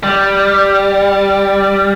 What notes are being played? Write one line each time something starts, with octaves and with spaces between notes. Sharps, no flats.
G3